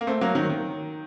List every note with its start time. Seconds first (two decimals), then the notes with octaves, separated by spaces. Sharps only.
0.01 A#3
0.07 A3 C4
0.21 F#3 A#3
0.35 D#3 F#3
0.49 D#3